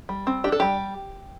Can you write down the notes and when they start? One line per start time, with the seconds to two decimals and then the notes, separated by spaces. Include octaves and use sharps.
0.09 G3
0.27 C4
0.44 D4 G4
0.52 A4
0.60 G3 G4